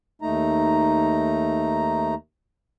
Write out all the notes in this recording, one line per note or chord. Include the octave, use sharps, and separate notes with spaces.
D#2 A3 D#4 A#5